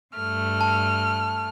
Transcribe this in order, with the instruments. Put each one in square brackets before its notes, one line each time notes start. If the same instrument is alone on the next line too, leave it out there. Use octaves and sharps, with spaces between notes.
[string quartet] G2 A3 [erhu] F6
[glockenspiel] A5